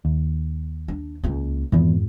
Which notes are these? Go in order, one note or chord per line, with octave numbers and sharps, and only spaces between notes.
D#2
D4
C#2 A#3
F2 G#2 D#3 E3 B3